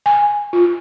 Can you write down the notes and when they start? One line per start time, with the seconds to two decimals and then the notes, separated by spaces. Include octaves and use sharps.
0.06 G#5
0.53 F4